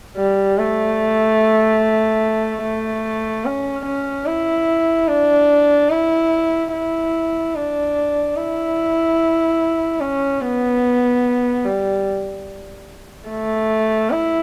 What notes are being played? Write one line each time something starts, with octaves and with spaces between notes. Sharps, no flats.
G3
A3
A3
C#4
C#4
E4
D4
E4
E4
D4
E4
C#4
B3
G3
A3
E4